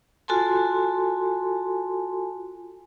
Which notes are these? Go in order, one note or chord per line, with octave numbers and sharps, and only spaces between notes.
F4 F#4 A4 G#5 A5 C6